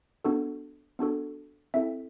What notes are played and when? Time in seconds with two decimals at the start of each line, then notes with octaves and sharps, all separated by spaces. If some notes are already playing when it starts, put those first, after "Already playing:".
0.24 B3 D4 F#4 A4
0.99 B3 D4 F#4 A4
1.74 C4 E4 A4 E5